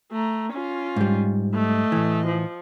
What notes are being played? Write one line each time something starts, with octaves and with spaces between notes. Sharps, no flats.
A3 A#5
C#4 F4
G#2 G3
A3 D#5
A2 E3
F3